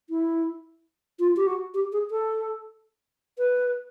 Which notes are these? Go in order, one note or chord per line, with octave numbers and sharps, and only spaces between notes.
E4
F4
G4
F#4
G4
G#4
A4
B4